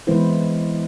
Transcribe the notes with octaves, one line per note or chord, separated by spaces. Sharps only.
E3 G#3 B3 E4 B4 C5